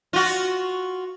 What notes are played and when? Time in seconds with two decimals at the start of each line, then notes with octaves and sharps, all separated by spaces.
0.13 F4 F#4